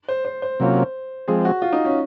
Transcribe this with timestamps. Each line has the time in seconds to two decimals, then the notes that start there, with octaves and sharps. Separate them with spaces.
0.08 C5
0.25 C5
0.42 C5
0.60 C3 F#3 A#3 C#4 F4
1.28 F3 G#3 C4 G#4
1.45 F#4
1.62 F4
1.72 D#4
1.85 C#4